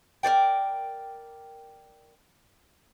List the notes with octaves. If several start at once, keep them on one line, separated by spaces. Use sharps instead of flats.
A#4 C5 D5 G5